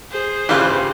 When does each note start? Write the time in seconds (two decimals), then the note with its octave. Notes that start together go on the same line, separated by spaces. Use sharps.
0.11 G#4 C5
0.49 G2 C#3 E3 F4 G4